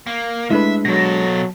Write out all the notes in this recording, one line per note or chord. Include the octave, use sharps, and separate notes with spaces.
A#3
G#3 A3 D4 E4 B4 E5
B2 F#3 A4 A#6